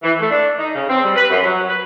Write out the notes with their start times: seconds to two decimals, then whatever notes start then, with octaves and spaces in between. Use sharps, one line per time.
0.03 E3
0.19 A3
0.31 D4
0.59 D#4
0.75 C#3
0.89 C4
1.03 G3
1.16 B4
1.30 F#2
1.43 F#3
1.69 B4